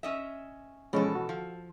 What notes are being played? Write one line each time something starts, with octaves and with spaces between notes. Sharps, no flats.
C#4 D#5 E5
B2 E3 F3 G#3 C#4 A4
F#4
F3